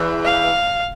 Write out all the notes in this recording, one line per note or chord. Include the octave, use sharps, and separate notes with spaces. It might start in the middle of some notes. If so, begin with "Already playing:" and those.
Already playing: E2 E3
F5